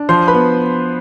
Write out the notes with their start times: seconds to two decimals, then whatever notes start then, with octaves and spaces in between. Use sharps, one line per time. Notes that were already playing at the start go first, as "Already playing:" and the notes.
Already playing: D4
0.09 F3 C5 C6
0.28 B4 B5
0.34 B3